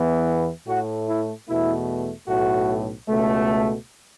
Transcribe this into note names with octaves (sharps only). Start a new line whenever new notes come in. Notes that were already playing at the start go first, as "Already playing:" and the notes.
Already playing: E2 E3 B3
A2 A3 F#4
E4
E2 B2 A3 E4
B1 A2 A3 F#4
C#2 B2 A3